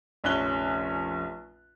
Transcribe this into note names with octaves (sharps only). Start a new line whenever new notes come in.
F1 A#1 C#4 F#6 G7